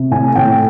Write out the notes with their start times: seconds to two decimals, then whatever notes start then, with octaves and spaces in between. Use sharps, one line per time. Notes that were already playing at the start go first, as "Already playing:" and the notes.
Already playing: C3
0.11 A2 G#5
0.35 A2 G5